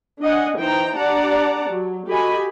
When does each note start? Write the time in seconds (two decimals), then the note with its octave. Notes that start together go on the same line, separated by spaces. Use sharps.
0.20 D4 D#5 F#5 G#5
0.56 E3 D#4 C5 G5 A#5
0.96 D4 G4 D5 F#5 A5 A#5
1.70 F#3
2.07 F#4 G4 A4 D#5 G#5 B5